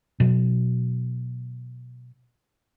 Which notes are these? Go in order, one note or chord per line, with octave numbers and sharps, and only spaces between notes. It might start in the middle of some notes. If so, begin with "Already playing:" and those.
B2 F#3